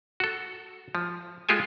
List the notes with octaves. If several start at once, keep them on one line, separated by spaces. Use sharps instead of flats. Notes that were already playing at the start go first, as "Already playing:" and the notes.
F#4 A4
F3
G#3 F4 G4 A4 G#5